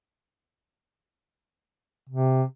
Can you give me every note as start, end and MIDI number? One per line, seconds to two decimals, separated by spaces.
2.09 2.43 48